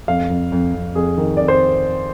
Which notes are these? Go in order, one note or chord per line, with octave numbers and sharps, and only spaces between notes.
F2 F5
F2
F2
F2
F2 G#4
D#3
F2 D5
C5